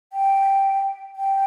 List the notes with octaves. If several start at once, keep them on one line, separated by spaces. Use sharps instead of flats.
G5
G5